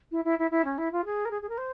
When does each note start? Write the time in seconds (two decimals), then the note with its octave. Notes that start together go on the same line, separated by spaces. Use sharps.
0.11 E4
0.24 E4
0.38 E4
0.51 E4
0.64 C#4
0.78 E4
0.92 F4
1.05 G#4
1.25 A#4
1.30 G#4
1.42 G#4
1.49 A#4
1.57 C5